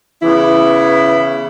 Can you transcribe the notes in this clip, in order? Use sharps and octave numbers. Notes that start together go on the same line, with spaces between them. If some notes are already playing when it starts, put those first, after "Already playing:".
C#3 E3 B3 E4